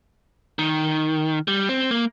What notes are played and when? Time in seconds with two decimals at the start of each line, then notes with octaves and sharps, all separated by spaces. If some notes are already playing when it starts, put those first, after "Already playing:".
0.59 D#3
1.48 G3
1.69 C4
1.91 A#3